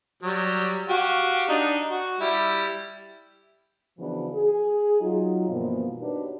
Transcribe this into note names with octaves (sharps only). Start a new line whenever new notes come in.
F#3 G3
F#4 G4 F5
D4 D#4
F#4
G3 E4
C#3 E3 F3 B3 D4 F#4
G#4
F#3 D#4 F4
G2 B2 E3 F3 A#3
D4 D#4 F#4 G4 B4 C#5